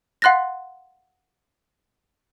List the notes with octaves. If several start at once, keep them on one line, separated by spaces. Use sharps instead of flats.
F5 F#5 C6 F#6 A6 A#6